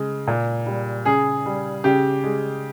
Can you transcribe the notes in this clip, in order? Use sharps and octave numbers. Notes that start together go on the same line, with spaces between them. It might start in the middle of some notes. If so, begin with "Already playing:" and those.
Already playing: C#3 G#3
A#2
G3
C#3 G#4
G3
C#3 G4
G#3